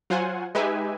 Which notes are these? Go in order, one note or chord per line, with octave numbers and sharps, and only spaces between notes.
F#3 F4 C5 F#5 G#5
G#3 D#4 G4 B4 E5 G#5